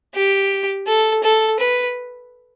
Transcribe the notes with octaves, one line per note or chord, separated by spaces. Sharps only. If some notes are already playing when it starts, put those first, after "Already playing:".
G4
A4
A4
B4